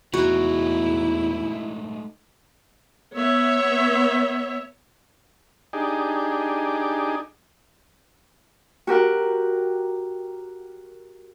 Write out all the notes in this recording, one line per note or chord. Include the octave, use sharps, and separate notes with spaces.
E2 G#3 A3 D#4 E4 F#4
B3 C#5 E5
D4 D#4 G4 G#4
F#4 G4 A#4 F#5